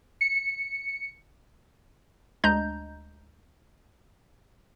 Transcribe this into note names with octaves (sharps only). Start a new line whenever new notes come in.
C#7
D2 G#3 D4 D#5 A#5 G6